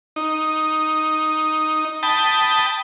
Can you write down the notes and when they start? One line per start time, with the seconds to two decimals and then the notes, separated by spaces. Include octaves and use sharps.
0.16 D#4
2.03 G5 A5 B5 D#6